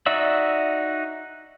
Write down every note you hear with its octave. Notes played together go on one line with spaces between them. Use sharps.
D#4 F#4 D5 E5 E6